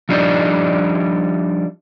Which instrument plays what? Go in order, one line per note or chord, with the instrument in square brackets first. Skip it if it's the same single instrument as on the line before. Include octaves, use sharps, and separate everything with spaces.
[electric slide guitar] F3 G3 D4 D#4 D#5